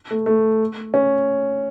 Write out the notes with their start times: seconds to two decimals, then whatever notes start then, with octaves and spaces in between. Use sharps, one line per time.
0.11 A3
0.26 A3
0.94 C#4